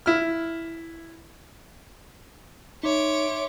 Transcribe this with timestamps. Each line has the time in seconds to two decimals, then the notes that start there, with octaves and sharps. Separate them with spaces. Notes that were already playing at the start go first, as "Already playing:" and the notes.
0.06 E4 F6
2.83 D#4 C#5 E5 C6 D6 D7